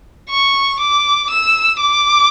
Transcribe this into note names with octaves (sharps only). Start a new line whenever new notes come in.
C#6
D6
E6
D6